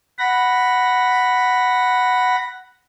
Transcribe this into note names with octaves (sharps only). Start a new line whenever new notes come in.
F#5 B5 A#6